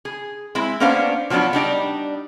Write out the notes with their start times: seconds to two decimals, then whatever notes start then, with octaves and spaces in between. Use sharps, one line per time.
0.05 G#4
0.55 G#3 C4 E4
0.80 A#3 B3 C#4 D4 C5 F5
1.30 F3 F#3 B3 C#4 D4
1.53 G3 D4 D#4 D5